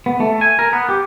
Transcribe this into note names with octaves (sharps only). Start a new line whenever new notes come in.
B3
A3
G#5
A#4
B3
G4